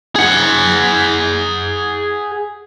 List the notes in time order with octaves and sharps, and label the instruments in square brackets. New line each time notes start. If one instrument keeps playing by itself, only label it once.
[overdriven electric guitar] G#4 F#5